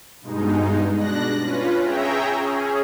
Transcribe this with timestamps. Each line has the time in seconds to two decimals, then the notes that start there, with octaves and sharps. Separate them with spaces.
0.22 G2 B2 G#3 D#4
0.96 B2 D4 F#6 A#6
1.41 C#4 F4 B4
1.80 G#4 C#5 E5 G5 A#5
2.38 C#4 G#4